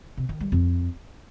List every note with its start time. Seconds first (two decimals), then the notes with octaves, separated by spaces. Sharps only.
0.17 C3
0.29 D#3
0.40 G3
0.52 F2